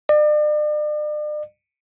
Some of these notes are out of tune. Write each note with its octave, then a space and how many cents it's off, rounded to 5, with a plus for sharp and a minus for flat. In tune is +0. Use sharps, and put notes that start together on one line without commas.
D5 +40